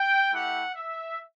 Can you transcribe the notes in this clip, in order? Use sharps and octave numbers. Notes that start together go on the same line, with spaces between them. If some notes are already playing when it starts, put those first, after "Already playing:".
Already playing: G5
A3 E4 G4 F#5
E5